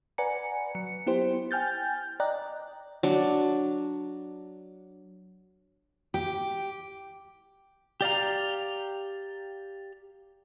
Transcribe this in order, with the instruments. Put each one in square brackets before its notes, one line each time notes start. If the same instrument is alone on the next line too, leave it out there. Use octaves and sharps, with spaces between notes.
[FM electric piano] B4 D5 F#5 G#5 A#5 C#7
F#3 C#7
B3 E4 G4 C5
G5 G#5 F6 G6 A6
D5 D#5 G5 A#5 F#6
[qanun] F#3 D4
[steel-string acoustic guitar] G4
[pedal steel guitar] G4 D5 F5 A#5